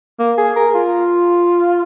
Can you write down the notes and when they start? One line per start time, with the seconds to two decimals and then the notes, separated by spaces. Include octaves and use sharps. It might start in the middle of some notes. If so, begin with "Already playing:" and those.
0.20 A#3
0.38 G#4
0.56 A#4
0.75 F4